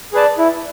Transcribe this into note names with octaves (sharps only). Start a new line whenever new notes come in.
G#4 B4 D5 A5
E4